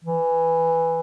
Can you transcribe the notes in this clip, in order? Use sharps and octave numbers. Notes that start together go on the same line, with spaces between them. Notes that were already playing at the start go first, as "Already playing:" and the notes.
E3